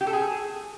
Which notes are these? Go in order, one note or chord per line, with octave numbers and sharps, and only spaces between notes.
G4
A4
G#4